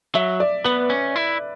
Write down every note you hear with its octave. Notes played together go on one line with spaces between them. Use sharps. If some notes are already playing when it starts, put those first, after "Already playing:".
F#3 E5
D5
B3 B4
C#4
E4